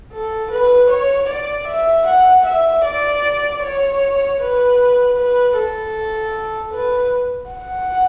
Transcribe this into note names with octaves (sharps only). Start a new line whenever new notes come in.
A4
B4
C#5
D5
E5
F#5
E5
D5
C#5
B4
B4
A4
B4
F#5